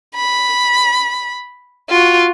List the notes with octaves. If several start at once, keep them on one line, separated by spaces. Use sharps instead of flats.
B5
F4 F#4